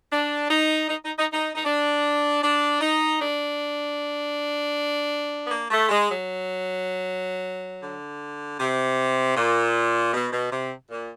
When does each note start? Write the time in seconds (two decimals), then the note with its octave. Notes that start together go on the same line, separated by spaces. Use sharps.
0.11 D4
0.50 D#4
0.88 D#4
1.03 D#4
1.18 D#4
1.33 D#4
1.54 D#4
1.65 D4
2.43 D4
2.81 D#4
3.19 D4
5.45 B3
5.51 A#3
5.70 A3
5.88 G#3
6.09 F#3
7.82 D3
8.59 C3
9.36 A#2
10.13 B2
10.32 B2
10.51 C3
10.90 A#2